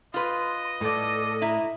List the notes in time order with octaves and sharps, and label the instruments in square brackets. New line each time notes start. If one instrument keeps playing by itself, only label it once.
[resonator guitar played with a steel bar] F4 B4 [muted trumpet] D#5 [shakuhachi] C6
[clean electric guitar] A2 D5 [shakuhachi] A4
[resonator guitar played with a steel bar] E4 [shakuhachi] A#5